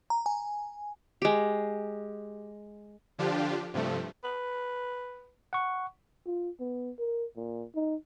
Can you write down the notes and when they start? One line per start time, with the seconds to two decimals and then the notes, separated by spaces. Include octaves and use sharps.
0.10 A#5
0.26 G#5
1.22 G#3 G4
3.19 D3 F3 D4 F4 G4
3.74 G2 C3 F3 A3
4.24 B4
5.53 F#5 C#6
6.26 F4
6.60 B3
6.99 A#4
7.36 A#2
7.75 D#4